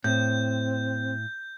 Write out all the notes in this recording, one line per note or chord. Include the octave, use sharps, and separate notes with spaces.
A2 C4 G6